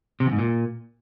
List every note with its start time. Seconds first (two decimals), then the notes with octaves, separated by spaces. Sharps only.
0.20 C3
0.26 E2
0.33 G#2
0.39 A#2